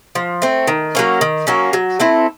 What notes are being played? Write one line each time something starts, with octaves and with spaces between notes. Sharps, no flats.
F3
A3 C4
D#3
F#3 A#3 C#4
D#3
F#3 A#3 C#4
F#3
A3 C4 E4